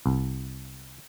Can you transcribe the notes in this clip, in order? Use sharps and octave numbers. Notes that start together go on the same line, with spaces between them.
C2